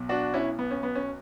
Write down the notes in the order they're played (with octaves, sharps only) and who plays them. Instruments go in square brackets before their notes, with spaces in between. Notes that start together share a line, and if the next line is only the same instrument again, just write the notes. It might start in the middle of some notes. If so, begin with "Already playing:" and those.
Already playing: [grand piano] B1 B2 F#3
D4 F#4
C#4 E4
B3
C#4
B3
C#4